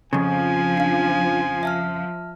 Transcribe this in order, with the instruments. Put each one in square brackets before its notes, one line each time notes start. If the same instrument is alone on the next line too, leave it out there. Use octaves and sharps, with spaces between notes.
[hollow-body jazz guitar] F2 C#3 [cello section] F3 [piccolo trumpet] G#5
[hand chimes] D4 F5
E5 A5 F6